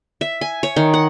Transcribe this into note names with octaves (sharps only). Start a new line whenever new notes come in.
E5
G#5
C#5
D#3
F#5